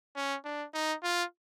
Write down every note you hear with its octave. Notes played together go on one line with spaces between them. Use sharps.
C#4
D4
D#4
F4